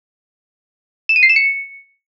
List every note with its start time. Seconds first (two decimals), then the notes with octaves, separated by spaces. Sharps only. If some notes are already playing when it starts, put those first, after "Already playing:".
1.09 E7
1.16 D#7
1.23 C7
1.29 E7
1.36 C#7